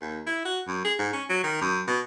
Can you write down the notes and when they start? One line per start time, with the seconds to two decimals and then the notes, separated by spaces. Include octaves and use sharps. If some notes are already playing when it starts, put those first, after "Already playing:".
0.01 D#2
0.26 E4
0.45 F#4
0.67 F#2
0.85 G#4
0.99 G#2
1.13 C#4
1.30 F#3
1.44 D#3
1.62 F#2
1.87 B2